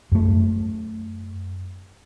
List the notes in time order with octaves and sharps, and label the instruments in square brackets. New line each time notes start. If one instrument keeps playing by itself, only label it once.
[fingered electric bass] F#2 A3